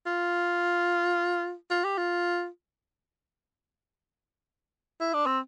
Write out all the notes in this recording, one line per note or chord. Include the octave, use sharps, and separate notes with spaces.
F4
F4
G4
F4
E4
D4
C4